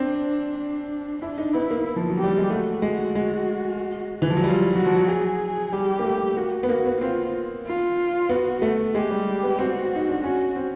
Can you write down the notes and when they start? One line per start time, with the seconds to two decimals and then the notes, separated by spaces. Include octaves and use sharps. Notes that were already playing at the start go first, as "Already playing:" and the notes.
Already playing: C4 D4
0.58 D4
1.22 D4 E4
1.38 D#4
1.54 B3 E4
1.71 A#3
1.96 F3
2.10 F#3
2.19 G3 G4
2.37 G#3
2.50 A3 F#4
2.82 G#3
3.15 G#3
4.22 E3
4.30 F3
4.37 F#3
4.44 G3 F4
4.75 F#3 F#4
4.86 F3
4.96 F#3
5.08 G#4
5.72 G3 G4
5.99 A#3
6.04 A3
6.37 A#3 F#4
6.63 B3
6.69 A#3 F#4
6.85 B3
7.01 C4 F4
7.66 F4
8.29 B3 F#4
8.62 A3
8.95 G#3 G4
9.11 G3
9.43 B3
9.59 C4 F#4
9.96 D#4
10.09 D4
10.23 C#4 F#4
10.56 C4